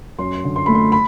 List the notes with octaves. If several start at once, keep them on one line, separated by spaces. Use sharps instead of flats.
F#2 C6
D3
C6
A3 B5
C6
B5